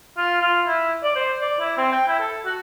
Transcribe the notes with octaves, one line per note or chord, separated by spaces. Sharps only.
F4
F4
E4
D5
C5
D5
E4
C4
G5
E4
A4
F#4